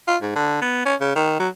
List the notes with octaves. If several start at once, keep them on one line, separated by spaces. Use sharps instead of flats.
F4
G#2
D3
B3
C#4
C#3
D#3
F#3